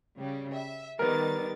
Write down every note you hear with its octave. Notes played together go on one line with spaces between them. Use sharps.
C#3 G3
E5
D#3 G3 B3 A#4 A6